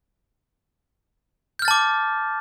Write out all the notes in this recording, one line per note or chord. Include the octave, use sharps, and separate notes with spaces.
A5 D6 F6 G6 A6